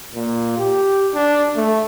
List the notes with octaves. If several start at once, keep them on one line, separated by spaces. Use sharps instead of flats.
A#2
G4
D4
A3